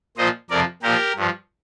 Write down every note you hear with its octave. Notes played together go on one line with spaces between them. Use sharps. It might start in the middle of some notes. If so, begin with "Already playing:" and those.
A#2 F3 C5 D#5
F2 C3 F3 A#4 D5
A#2 F3 G4 A#4
G2 F3